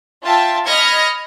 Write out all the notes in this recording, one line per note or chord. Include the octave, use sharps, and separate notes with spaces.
F4 E5 G5 A5
D#5 B5 F6 G#6 A#6 C#7